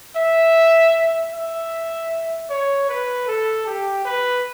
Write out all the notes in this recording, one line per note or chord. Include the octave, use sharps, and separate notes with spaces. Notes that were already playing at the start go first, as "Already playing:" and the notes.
E5
E5
C#5
B4
A4
G4
B4